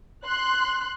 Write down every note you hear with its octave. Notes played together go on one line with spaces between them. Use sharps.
C6 F#6